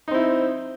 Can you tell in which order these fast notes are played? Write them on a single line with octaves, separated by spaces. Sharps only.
D#4 C4 E4